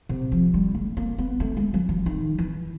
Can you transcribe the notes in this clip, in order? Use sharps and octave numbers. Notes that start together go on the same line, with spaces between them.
C3
F3
G3
A3
A#3
B3
A3
G#3
F#3
E3
D#3
E3